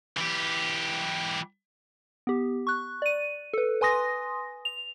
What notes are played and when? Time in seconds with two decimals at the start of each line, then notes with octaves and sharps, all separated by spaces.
0.17 E3 G4
2.27 B3 G4
2.67 C#6 F#6
3.02 D5 D#7
3.54 A4 B4
3.81 B4 G#5 C6 D#6 A#6
4.65 F7